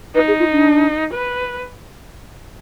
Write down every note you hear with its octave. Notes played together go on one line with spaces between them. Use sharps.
D#4 B4
G#4
F4
D4
B4